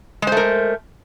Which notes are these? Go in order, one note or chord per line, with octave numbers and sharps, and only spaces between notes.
G#3 A3 A#4 C5